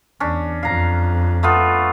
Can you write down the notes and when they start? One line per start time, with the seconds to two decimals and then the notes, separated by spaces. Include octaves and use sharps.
0.20 E2 C#4 D4
0.63 F2 F5 A#5
1.43 A3 B3 F4